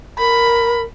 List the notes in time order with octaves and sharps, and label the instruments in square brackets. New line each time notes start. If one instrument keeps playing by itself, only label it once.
[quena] A#4 [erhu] B5